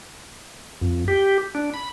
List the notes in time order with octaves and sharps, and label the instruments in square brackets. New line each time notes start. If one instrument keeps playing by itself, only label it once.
[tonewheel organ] F2
G4
D4
B5